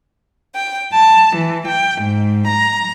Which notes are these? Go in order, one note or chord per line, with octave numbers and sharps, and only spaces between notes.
G5
A5
E3
G5
G#2
A#5